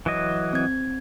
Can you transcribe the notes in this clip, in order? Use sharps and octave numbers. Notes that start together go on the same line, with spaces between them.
E3 F#3 D#5
C4 G#6